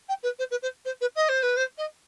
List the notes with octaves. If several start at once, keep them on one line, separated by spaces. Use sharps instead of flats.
G5
B4
C5
B4
C5
C5
B4
D#5
C5
B4
C5
D#5